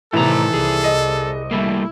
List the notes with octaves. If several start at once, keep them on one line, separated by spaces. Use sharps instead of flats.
A2 C3 D#3 E3 A4 A#5
C2 G#4
D#5
G3 A3 A#3 E4